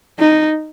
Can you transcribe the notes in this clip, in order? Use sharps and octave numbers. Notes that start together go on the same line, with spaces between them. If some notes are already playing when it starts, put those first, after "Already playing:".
D#4